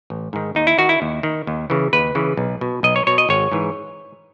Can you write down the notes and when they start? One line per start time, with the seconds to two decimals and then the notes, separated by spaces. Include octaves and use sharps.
0.10 A1
0.33 G#2 D#3
0.55 D#2 D#4
0.67 E4
0.78 D#3 F#4
0.89 E4
1.02 D#2
1.23 D#3
1.47 D#2
1.70 C#3 E3
1.93 D#2 B4
2.15 C#3 E3
2.37 B1
2.61 B2
2.83 B1 D#5
2.96 C#5
3.07 B2 C#5
3.18 D#5
3.29 G#1 C#5
3.52 G#2 E3